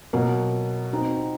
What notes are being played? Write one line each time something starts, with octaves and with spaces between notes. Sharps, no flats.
B2 F#3 A#3
C4 D#4 F#4